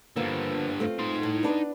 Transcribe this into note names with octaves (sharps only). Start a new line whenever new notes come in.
G2 D3 F3 A#3 B3
A3 C4 F4
D#4 C6
A2
B3 D4 B4